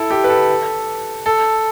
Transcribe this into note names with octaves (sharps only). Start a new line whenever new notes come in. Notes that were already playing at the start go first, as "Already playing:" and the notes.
Already playing: E4 A4
G4
B4
A4
A4